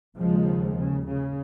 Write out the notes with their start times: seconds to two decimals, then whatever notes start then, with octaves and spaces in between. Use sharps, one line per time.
0.17 D#2 C#3 F3 G#3
0.77 C#3
1.08 C#3